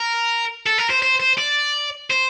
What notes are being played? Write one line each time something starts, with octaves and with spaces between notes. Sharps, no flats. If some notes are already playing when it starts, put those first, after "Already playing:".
Already playing: A#4
A4
A#4
C5
C5
C5
D5
C5